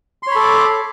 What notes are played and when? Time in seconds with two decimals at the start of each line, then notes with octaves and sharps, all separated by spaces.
0.23 C6
0.27 C#5
0.31 B5
0.36 A4
0.40 D6